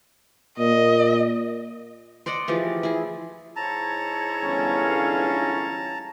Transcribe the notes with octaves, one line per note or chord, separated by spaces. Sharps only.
A#2 D#5
C5 D5 D#5 F#5
E3 F3 G4 G#4
E4 G#4
G#2 E4 C#5 A5 A#5
G1 E3 C#4 F5